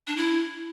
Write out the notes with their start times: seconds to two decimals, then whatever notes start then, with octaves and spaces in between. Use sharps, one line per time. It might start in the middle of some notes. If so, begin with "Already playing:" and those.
0.07 D4
0.17 E4